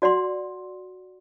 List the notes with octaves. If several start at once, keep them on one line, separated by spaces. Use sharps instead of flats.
F#4 D5 F#5 C6